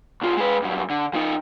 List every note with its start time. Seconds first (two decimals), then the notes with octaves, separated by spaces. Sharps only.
0.21 C2 F4
0.37 G#3 B4
0.62 G2 F#3
0.90 D3
1.14 F3 D#4